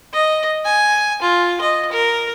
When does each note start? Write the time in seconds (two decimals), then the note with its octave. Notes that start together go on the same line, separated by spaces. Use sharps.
0.13 D#5
0.65 G#5
1.22 F4
1.61 D#5
1.92 A#4